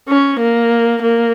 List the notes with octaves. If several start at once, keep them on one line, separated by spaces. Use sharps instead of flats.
C#4
A#3
A#3